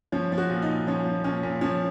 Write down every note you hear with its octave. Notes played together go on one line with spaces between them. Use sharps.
F3 C#4
F3
F#4
A#2
D#4
A#2
F3 C#4
F3
A#2 C#4
A#2
F3 C#4